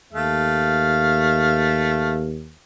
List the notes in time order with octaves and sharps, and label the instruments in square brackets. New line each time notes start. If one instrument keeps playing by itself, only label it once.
[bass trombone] D#2 [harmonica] A3 F5